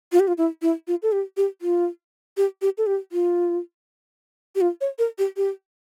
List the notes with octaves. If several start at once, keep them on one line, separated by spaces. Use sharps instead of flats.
F4
G4
F4
E4
E4
F4
A4
G4
G4
F4
G4
G4
A4
G4
F4
G4
F4
C#5
A#4
G4
G4